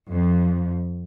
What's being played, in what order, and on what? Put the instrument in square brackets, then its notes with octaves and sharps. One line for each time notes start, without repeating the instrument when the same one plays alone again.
[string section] F2